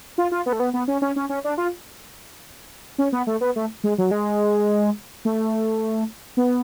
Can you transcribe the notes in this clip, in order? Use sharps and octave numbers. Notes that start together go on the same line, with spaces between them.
F4
F4
B3
A3
B3
B3
C#4
C#4
C#4
C#4
D4
F4
C#4
B3
A3
B3
A3
G#3
F#3
G#3
A3
B3